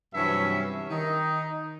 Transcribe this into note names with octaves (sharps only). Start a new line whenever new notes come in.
G2 C3 E3 F#3 C#4 E5
D#3 D#4